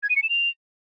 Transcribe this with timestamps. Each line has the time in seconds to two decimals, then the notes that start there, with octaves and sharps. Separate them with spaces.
0.03 G#6
0.09 D#7
0.16 C#7
0.23 E7
0.29 F7